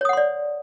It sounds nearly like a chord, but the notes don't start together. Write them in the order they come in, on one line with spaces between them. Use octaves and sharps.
C#5 D#6 F#5 C6 D5